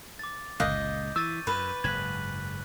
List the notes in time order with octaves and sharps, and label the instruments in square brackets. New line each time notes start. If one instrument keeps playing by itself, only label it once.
[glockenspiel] D6 A6
[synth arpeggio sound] G1 F5 F#6 [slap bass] C#2 A#2 [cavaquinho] D#5 [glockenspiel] D6 G6
[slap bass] E3 [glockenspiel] C#6 A6 D#7 [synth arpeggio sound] E6
[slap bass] F#2 [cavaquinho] B4
[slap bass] F#1 G#2 [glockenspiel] F#6 B6 F#7 [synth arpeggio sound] G#6